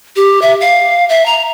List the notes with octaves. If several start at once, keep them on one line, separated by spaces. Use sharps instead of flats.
G4
E5
F5
E5
A#5